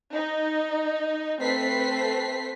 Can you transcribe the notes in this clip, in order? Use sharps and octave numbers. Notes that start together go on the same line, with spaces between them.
D#4
A3 C4 A4 B4 B6 C7